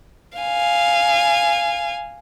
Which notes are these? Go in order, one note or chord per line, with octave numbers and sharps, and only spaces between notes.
F5 G#5